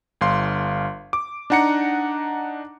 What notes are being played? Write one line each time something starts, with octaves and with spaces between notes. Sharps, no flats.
G1 F5 C6
D6
D4 D#4 F#5 A#5 C#7